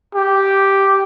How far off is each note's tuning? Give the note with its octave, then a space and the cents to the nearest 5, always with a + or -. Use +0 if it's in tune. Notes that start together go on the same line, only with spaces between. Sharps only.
G4 -5